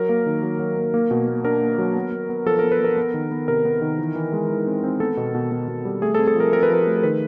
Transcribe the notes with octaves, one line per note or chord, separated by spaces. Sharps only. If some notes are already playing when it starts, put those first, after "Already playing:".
Already playing: F#3 A#4
A#3
D#3
F#3
F#3
A#3
A#3
B2
A#3
D4 A#4
A#3
F#3
B3
B3
B3
F3 A4
B3 A#4
B4
B3 A#4
B3
D#3
B3
C3 A#4
B3
D#3
E3
E3
G#3
E3
C4
C4
B3 A4
B2
B2
B2
B2
G3
A3 G#4
A4
C4
A4
F3 A#4
C4 A#4
B4
F3 A#4
A3
A#4
D#3 B4